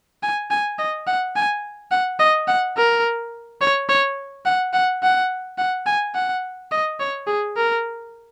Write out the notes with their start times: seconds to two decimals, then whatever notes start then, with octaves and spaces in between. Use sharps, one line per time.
0.23 G#5
0.51 G#5
0.79 D#5
1.07 F#5
1.36 G#5
1.91 F#5
2.20 D#5
2.48 F#5
2.77 A#4
3.61 C#5
3.89 C#5
4.46 F#5
4.73 F#5
5.03 F#5
5.58 F#5
5.86 G#5
6.15 F#5
6.72 D#5
7.00 C#5
7.27 G#4
7.57 A#4